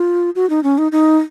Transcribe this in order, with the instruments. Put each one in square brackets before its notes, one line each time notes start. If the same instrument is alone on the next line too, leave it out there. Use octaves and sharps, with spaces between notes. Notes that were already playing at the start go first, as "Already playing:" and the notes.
Already playing: [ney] F4
F#4
D#4
C#4
D#4
D#4